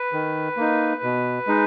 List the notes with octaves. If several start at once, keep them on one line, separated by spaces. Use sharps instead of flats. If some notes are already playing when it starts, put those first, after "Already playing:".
Already playing: B4
D#3
A#3 D#4
B2
G#3 D#4